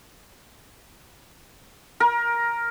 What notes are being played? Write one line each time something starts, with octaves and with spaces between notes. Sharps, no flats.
A#4